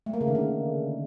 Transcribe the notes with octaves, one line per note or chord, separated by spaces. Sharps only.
A3
A#3
C#3
D#3
D3